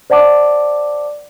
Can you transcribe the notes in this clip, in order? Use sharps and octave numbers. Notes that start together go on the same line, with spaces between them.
C5 D5 F#5 A5 D6